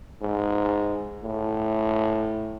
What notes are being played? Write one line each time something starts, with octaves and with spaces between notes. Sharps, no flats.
G#2
A2